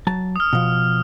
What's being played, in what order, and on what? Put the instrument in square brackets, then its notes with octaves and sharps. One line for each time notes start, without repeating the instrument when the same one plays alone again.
[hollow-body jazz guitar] F#3 A5
[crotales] D#6 F6
[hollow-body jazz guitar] B2 F3